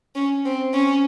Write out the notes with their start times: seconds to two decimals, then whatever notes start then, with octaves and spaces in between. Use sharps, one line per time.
0.15 C#4
0.45 C4
0.74 C#4